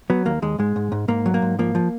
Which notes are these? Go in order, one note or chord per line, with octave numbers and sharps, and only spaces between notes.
F#3 B3
D#2 A#3
D#2 G#3
G#2 G#3
G#2
G#2
G#2 A#3
F#3
A#3
G#2
F3 A#3
F3